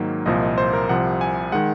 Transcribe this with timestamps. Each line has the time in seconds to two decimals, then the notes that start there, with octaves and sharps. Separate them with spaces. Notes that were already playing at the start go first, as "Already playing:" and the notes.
Already playing: G#2 D#3 F#3 A#3
0.26 C2 A#2 F3 D#5
0.42 D#5
0.58 C5
0.73 A#4
0.89 C2 C3 F3 F#5
1.21 G#5
1.52 D#3 G#3 F#5